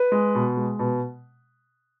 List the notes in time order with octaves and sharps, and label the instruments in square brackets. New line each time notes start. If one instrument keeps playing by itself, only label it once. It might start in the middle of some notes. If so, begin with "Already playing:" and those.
Already playing: [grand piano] B4
G#3
B2
G#3
B2